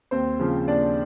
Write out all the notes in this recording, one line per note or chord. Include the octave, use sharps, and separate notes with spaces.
D#2 C4 C5
C#3 F3
D#2 D4 D5